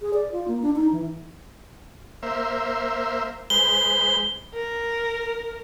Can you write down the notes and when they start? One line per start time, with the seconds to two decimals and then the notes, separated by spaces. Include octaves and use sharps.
0.01 G#4
0.14 D5
0.32 F4
0.48 A#3
0.62 D4
0.76 D#4
0.92 E3
2.23 A#3 C5 E5
3.50 G#3 B4 C5 G7
4.54 A#4